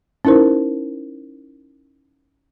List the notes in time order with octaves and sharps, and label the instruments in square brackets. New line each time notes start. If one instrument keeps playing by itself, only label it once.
[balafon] C#4 D#4 E4 A#4 C5